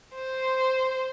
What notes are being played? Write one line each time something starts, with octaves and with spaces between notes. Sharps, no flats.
C5